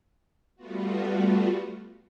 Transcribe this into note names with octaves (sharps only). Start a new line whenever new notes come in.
G3 A3 B3 F4 F#4